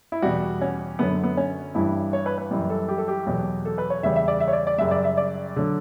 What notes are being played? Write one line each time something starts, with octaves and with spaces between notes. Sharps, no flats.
E4
E2 B2 G3 F#4
C#4
F#2 D3 F#3 B3
B3
C#4
G2 E3 G3 E4
C#5
B4
B4
F#2 E3 G3
A4
G4
A4
G4
E2 B2 F#3
A4
B4
C#5
E2 C#3 G3 E5
E5
D5
E5
C#5
D5
D5
F#2 C#3 G3 E5
D5
E5
D5
D3 F#3